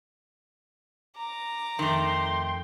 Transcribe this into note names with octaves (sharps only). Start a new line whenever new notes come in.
A#5 D6
F2 D#3 A3 G5 C6